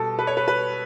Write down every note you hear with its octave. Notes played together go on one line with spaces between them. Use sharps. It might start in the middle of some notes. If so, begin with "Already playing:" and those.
Already playing: B2 G3 A4
B4
C#5
B4
B4